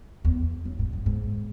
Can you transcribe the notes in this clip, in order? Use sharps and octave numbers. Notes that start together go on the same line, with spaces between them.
E2
F#2
G#2
F#2
G#2